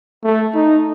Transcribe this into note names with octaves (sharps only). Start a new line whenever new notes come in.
A3
D#4